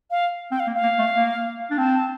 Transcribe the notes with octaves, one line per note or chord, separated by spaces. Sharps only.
F5
C4 G5
F5
A#3
F5
A#3
A3
A#3
D4
C4 A5
A5